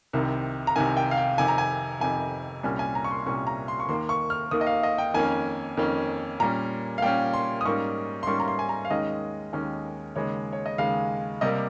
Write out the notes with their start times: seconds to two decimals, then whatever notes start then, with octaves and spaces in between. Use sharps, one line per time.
0.13 C2 C3 D#3
0.67 A#5
0.76 C2 C3 D#3 G#5
0.97 G5
1.11 F5
1.17 G5
1.38 F2 C3 D#3 G#5
1.48 A#5
1.58 G#5
2.00 F2 C3 D#3 G#5
2.63 C2 A#2 G3 C#4 G#5
2.79 G#5
2.95 A#5
3.04 C#6
3.11 C6
3.26 C2 A#2 G3 C#4 C#6
3.47 A#5
3.68 C6
3.80 C#6
3.89 D#2 D#3 A#3 C6
4.09 C#6
4.30 F6
4.51 D#2 D#3 A#3 D#6
4.61 D#5
4.67 F5
4.83 D#5
4.98 G5
5.14 F2 D#3 A#3 C#4 G#5
5.77 F2 D#3 A#3 C#4
6.40 A#2 G3 C#4 A#5
6.98 F5
7.02 A#2 G3 C#4 G5
7.33 C6
7.61 D#6
7.65 G#2 G3 A#3 C#4 C#6
8.23 C6
8.27 G#2 G3 A#3 C#4 C#6
8.40 A#5
8.48 C6
8.59 G#5
8.69 A#5
8.85 F5
8.90 D#2 D#3 G#3 C#4 D#5
9.53 D#2 D#3 G#3 C#4
10.16 D#2 C#3 G#3 C#5
10.53 C#5
10.66 D#5
10.78 D#2 C#3 G#3 F5
11.41 C3 G3 A#3 D#5